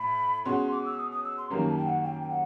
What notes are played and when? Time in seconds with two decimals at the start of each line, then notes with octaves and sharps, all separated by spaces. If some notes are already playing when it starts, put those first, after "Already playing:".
Already playing: A2 B5
0.45 B2 G#3 C#4 F#4 C6
0.72 D6
0.86 E6
0.98 D#6
1.11 D#6
1.24 E6
1.38 C6
1.50 F#2 D#3 G3 A#3 C#4 A#5
1.68 A5
1.78 G5
1.86 F#5
2.04 G5
2.22 G5
2.30 F#5